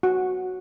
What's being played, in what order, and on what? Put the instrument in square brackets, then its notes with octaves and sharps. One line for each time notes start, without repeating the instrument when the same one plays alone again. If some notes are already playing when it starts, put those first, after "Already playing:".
[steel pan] F#4